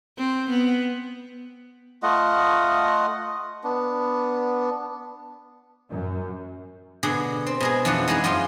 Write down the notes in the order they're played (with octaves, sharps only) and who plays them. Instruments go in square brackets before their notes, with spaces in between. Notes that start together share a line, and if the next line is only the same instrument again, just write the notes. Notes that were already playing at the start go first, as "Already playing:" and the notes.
[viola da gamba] C4
B3
[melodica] A3 F4 D#5 F#5
B3 D4
[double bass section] F#2
[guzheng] B2 D3 G#4
C4
B2 G#3 G#4
F2 E3 C#4 D4 F#5
G#3 D#4 E4 F#4 G#4
F#2 F4 D#5 G5 C6